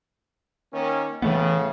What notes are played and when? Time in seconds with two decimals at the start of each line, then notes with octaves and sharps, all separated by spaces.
0.73 D#3 A#3 C#4
1.22 A2 C#3 E3 A3 B3